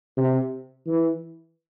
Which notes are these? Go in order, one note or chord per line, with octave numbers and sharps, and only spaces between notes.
C3
E3